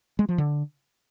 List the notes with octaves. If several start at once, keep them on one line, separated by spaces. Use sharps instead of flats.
G#3
F3
D3